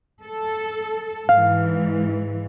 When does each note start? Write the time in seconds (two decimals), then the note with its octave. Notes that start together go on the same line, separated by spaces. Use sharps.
0.23 A4
1.29 G#2 E3 F5